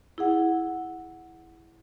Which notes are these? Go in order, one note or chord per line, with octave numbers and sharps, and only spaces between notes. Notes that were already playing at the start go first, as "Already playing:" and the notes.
E4 G#4 F#5